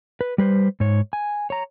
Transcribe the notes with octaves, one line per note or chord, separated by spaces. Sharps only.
B4
G3 B4 C5
G#2 C#5
G#5
C#5 A#5